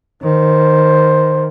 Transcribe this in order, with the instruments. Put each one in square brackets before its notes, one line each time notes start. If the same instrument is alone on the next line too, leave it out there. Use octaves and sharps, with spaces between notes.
[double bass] D#3 [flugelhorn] C5